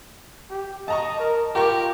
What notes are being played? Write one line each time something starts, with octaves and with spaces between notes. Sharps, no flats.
G4
D#5 A5 A#5 C#6
A#4
F4 G4 A#4 A#5 C#6